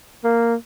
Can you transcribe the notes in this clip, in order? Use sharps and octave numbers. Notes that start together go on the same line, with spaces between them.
A#3